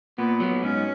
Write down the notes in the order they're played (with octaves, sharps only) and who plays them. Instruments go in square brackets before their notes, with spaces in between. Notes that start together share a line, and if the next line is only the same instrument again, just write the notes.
[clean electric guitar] A#2 [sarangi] B3
[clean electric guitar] F#3 B3
[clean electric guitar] G#2 [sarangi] C#4